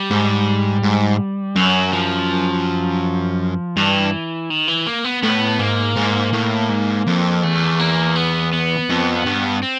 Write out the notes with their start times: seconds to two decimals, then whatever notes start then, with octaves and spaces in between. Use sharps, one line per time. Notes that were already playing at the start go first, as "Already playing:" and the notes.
Already playing: G3
0.11 G#2
0.83 G#2
1.56 F#2 F#3
1.93 F3
3.76 G2 E3
4.50 D#3
4.68 E3
4.87 A#3
5.04 B3
5.22 A2 B3
5.59 G#2 A#3
5.96 G#2
6.33 A2
6.69 G#2
7.07 F2
7.43 E2 A3
7.79 A#3
8.16 B3
8.53 B3
8.90 F2
9.26 G2
9.63 C4